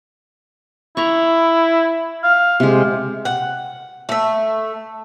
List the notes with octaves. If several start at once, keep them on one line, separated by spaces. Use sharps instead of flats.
E4 A#5 C#6
F5
C3 G#3
F#5
A3 E5